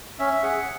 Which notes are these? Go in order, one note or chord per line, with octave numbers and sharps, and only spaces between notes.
C#4 E5
G#4 F#5